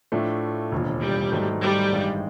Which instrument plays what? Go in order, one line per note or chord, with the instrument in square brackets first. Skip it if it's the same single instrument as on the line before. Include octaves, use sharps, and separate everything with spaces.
[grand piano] A2 F3 A3 D4
E1 D#2 D3 F3
[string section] G3
[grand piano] G#2 D#3 F#3 A3
[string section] G3
[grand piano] A1 G2 D#3 G#3